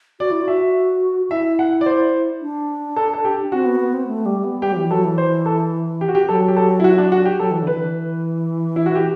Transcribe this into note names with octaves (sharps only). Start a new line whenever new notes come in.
F#4 D5
E4
F#4
E5
E4 E5
F#5
D5
C5
D4
A4
A4
G4
C4 F#4
B3
B3
C4
A3
G3
B3
G3 G4
F#3
E3
F#3 A4
E3
C5
A4
G4
F#4
G4
F#3 A4
G4
A4
E4
F#4
D4
F#4
G4
F#3 A4
E3
D3 B4
E3
E4
F#4
G4